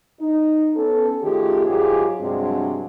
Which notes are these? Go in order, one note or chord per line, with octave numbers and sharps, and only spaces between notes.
D#4
B3 C#4 A4
D#3 A3 C#4 F4 G4 G#4
G#2 F#3 F4 G4 G#4
G2 C3 F#3 G#3 C4 D4